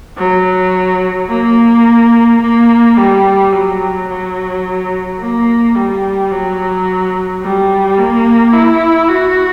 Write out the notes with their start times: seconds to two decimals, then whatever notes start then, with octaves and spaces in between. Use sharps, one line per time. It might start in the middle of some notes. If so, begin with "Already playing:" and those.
0.18 F#3
1.29 A#3
2.41 A#3
2.97 G3
3.52 F#3
4.08 F#3
5.20 A#3
5.75 G3
6.31 F#3
7.42 G3
7.97 A#3
8.53 E4
9.09 F#4